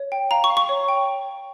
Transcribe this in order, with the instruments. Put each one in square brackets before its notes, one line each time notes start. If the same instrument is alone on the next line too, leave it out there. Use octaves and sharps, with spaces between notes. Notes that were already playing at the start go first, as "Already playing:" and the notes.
Already playing: [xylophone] C#5
G5
F5 A#5
C#6
F5
C#6
C#5
G5